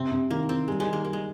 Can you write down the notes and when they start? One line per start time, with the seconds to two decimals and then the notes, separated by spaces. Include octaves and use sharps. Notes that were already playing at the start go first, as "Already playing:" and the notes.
Already playing: C3 C4
0.12 C3
0.30 D#3 A#3
0.49 D#3 C4
0.68 G3 G#3
0.80 G#3
0.86 D#3
0.93 A#3
1.05 G3 A#3
1.13 G#3